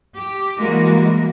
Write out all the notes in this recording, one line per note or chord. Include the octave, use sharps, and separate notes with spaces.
G4
E3 G3 G#3 A#3 F#4 A#4